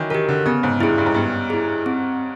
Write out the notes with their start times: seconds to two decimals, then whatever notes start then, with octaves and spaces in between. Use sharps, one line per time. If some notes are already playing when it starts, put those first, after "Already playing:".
Already playing: D#3 E3 F#3
0.10 D#3 G4 A#4
0.29 D3
0.46 C#3 B3
0.63 G#2
0.80 G2 E4 G#4
0.98 G2
1.06 G#2
1.14 G2 B3
1.50 E4 G#4
1.86 C4